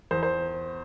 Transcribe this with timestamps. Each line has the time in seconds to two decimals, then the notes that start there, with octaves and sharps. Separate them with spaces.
0.11 E2 C5
0.23 C5